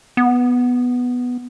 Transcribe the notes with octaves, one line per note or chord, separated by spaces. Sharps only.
B3